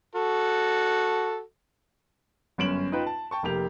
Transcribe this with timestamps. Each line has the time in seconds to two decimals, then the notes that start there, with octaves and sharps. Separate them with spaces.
0.15 F#4 A4
2.58 G1 F#2 C#4 D7 E7 F#7
2.92 D#4 F4 B4 G5
3.07 A5
3.31 G5 A5 C#6
3.43 F1 A#3 G4 F7